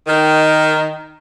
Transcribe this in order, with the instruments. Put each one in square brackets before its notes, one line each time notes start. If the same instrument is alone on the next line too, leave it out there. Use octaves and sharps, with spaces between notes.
[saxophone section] D#3